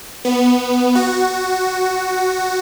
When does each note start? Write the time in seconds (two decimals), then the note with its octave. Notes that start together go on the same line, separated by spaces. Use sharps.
0.25 B3
0.95 F#4